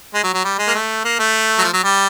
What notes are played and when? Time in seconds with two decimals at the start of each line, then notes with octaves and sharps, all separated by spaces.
0.14 G#3
0.24 F#3
0.34 F#3
0.44 G3
0.58 G#3
0.68 A#3
0.74 A3
1.05 A#3
1.19 A3
1.59 F#3
1.64 F3
1.73 F#3
1.84 G3